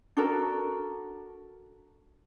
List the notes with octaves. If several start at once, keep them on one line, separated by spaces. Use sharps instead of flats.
D4 F#4 A4 A#4